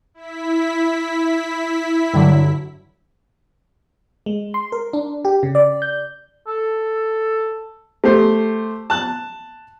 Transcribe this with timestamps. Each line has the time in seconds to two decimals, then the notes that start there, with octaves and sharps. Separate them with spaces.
0.14 E4 B6
2.14 G2 D3 F#3
4.26 G#3
4.54 C6
4.72 A#4
4.93 D4
5.25 G4
5.43 C#3
5.55 D5
5.82 G6
6.47 A4
8.04 A3 G4 C5
8.90 A5 F#6